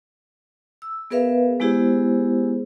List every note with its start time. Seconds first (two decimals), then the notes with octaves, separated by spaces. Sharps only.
0.82 E6
1.10 B3 G#4 A#4 B4 E5 F5
1.60 G#3 B3 E4 G4 G#4 C5